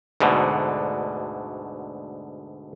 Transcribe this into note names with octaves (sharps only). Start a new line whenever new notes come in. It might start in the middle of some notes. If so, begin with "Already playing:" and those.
D2 G#2 B2 D3